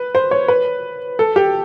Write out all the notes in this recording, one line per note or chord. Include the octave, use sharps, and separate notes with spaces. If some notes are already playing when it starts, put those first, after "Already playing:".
Already playing: B4
C5
C#5
B4
A4
G4